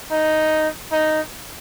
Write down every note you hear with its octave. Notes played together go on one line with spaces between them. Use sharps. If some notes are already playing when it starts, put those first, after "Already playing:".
D#4
D#4